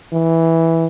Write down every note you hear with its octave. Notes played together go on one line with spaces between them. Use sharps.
E3